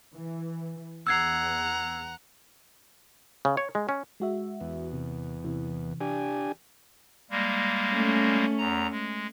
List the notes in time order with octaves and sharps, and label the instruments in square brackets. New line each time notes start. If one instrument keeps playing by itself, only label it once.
[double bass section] E3
[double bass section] E2 [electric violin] F#5 A#5 [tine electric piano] E6 G#6 C7
[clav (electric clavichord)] C#3
C#5
G#3
C#4
[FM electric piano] G#3 F#4 E5
[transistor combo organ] E2
[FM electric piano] C3
C3 E3
[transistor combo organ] D4 G4 G#5
[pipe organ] G3 G#3 A#3
[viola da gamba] A3 C#4
[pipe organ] E2 A#5
G#3